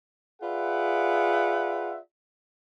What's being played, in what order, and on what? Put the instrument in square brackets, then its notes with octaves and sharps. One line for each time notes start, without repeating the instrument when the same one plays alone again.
[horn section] F4 G#4 B4 D5 E5 F#5